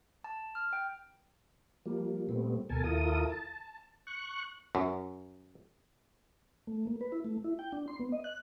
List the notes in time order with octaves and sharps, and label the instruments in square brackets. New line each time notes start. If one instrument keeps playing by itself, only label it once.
[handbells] A5
F6
G5
[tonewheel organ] F3 G3 A#3
A#2 G3 A3 B3 C4
D2 B2 A4 A#4 G#5 A5
D#2 E4 F4 A4 A#4 D#6
A5
C#6 F#6
[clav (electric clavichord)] F#2
[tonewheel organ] A3
A#3
B4
E4
A3
E4
G5
D4
C6
B3
D#5
F#6